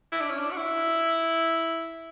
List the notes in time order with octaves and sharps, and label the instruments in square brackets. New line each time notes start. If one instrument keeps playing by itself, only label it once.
[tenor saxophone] E4
D4
C#4
D4
F#4
E4